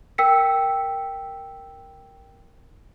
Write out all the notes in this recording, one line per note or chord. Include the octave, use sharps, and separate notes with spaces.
A#4 G5 E6 B6 C#7